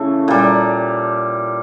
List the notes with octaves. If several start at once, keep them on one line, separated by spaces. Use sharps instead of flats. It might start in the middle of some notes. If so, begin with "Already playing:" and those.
Already playing: C#3 E3 A3
A#2 G3